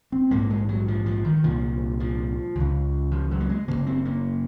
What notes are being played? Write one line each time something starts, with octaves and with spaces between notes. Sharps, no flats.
C4
A#1 G#2 A#3
G#3
F#3
F3
F3
D#3
C2 A#2 F3
F3
C#2 C#3
F3
F#3
A#3
G#3
F#1 F#2 C#3 A#3
C4
A#3